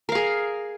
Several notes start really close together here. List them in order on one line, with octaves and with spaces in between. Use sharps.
A#4 F5 G#4